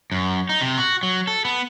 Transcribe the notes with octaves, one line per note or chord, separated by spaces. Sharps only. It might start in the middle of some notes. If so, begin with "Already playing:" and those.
F#2
D#4
C3
F#4
F#3
A4
B3